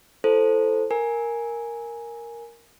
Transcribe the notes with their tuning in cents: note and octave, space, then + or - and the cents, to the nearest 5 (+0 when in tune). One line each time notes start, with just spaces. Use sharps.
E4 +40 A4 +0 C5 +0
A#4 +0 G#5 +0